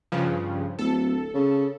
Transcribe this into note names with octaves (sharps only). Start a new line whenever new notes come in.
G2 C#3 F3
D1 A4
C#3